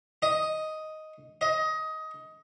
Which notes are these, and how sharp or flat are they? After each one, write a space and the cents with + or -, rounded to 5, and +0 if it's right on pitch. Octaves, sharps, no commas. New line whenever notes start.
D#5 +5
D#5 +20